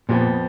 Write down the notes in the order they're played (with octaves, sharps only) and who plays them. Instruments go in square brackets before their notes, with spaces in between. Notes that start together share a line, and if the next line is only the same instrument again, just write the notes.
[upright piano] F2 F3 B3 [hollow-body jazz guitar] A#2